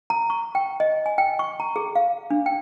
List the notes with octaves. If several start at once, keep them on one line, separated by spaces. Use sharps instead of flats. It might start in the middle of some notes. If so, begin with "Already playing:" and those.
A#5
C#6
G5
D#5
G#5
G5
C#6
A#5
G#4
F5
D4
G5